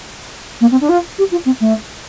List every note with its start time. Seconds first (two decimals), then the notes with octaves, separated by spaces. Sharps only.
0.61 A#3
0.71 C4
0.81 D4
0.89 F4
1.18 G4
1.31 F4
1.45 C4
1.60 A3